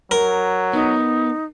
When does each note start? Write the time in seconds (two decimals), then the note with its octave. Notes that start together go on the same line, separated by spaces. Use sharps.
0.11 F#3 A#4
0.73 B3 D#4